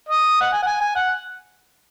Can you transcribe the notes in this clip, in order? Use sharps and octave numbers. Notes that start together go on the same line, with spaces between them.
D#5
F#5
G#5
F#5
G#5
G#5
F#5